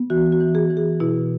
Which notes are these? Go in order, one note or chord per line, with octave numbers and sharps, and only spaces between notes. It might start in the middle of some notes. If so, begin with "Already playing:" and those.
Already playing: B3
E3 F#4
F#4
E3
G#4
E3
G#4
B2 E4